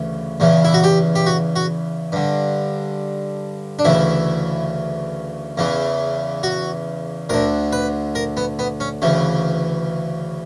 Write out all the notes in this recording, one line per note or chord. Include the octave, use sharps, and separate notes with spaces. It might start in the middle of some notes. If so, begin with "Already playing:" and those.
Already playing: D2 C#3 E3
E2 C#3 E3
E4
F#4
G4
G4
F#4
F#4
G2 D3
D4
D2 C#3 E3 E4
E2 C#3 E3
F#4
D2 D3 A#4
B4
A#4
B3
B3
C#4
D2 C#3 E3